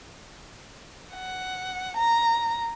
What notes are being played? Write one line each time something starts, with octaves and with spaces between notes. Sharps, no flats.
F#5
A#5